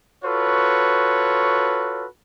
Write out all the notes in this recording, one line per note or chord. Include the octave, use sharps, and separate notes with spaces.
F4 F#4 A4 B4 C#5